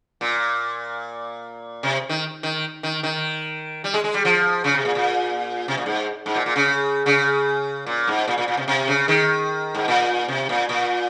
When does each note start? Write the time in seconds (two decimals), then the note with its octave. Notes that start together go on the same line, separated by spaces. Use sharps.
0.21 A#2
1.83 C3
2.09 D#3
2.43 D#3
2.83 D#3
3.03 D#3
3.84 G3
3.94 G#3
4.04 G#3
4.14 G3
4.25 F3
4.64 C#3
4.74 C3
4.85 A#2
4.95 A#2
5.68 C3
5.77 A#2
5.86 G#2
6.26 G#2
6.35 A#2
6.46 A#2
6.56 C#3
7.06 C#3
7.86 A#2
8.08 G#2
8.28 A#2
8.38 A#2
8.48 A#2
8.57 C3
8.68 C3
8.88 C#3
9.08 D#3
9.75 G#2
9.88 A#2
10.28 C3
10.49 A#2
10.69 A#2